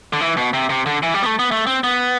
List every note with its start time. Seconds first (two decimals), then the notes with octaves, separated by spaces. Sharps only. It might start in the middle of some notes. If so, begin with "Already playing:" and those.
0.13 D3
0.21 E3
0.37 B2
0.53 C3
0.70 C3
0.86 D3
1.03 E3
1.14 G3
1.22 B3
1.26 A3
1.39 B3
1.52 A3
1.67 C4
1.84 B3